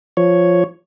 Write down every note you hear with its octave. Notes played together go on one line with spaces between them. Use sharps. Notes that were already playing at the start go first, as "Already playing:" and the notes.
F3 C#5